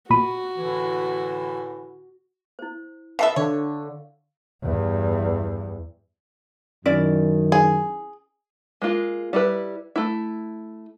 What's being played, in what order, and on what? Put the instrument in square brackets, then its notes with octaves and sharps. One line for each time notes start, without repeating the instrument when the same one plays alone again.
[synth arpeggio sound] A#2 B5 D#7 [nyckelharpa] F#4
[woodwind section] A2 D3 E3
[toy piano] E4 C5
[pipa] B2 A4 E5 [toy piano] F5
[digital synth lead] D3 [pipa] C#5
[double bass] E2 G2
[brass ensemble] F#2 D#3 [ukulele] C#4 E4 D5
[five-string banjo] G#4
G#3 A#3 F4
G3 E4 B4
A3 E4